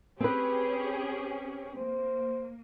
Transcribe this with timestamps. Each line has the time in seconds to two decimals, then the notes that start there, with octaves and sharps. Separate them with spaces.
0.20 C4 C#4 G4 G#4 B4
1.77 A#3 C5